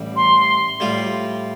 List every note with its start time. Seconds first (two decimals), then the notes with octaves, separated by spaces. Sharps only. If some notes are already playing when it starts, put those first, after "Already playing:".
Already playing: A1 A2 G3
0.16 C6
0.80 A2 G3 F4